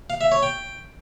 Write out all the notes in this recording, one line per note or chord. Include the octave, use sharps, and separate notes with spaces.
F5
E5
C#5
G5